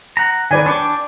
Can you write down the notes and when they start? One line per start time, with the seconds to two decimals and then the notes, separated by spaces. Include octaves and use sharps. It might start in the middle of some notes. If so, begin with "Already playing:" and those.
0.17 F#5 A#5
0.51 D#3 B4 D5 G#5
0.66 D4 G5 C#6 D6